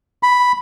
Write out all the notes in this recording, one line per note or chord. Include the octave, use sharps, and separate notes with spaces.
B5